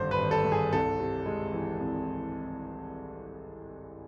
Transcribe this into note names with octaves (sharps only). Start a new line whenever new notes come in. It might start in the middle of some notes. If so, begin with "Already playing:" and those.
Already playing: G#1 G2 D3 G3 C5
B4
G#1
A4
G2
G#4
C2 A4
C3
G#3
E3
C2